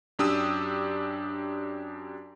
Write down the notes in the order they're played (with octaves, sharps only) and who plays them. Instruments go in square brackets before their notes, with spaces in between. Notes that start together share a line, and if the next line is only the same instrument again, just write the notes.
[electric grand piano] F#2 D4 G4 D#6 E6